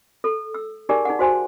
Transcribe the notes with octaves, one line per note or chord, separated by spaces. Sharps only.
A4
E6
D#4 G4 G#4 A#4 D5 G#5
D#4 G#4 F#5
F#4 C5 G#5 C6